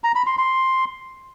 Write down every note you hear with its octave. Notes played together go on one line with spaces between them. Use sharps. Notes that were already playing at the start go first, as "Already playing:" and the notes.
A#5
B5
C6
C6